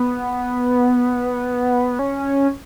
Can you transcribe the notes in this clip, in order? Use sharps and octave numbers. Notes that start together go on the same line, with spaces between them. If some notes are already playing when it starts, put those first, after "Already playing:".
Already playing: B3
C#4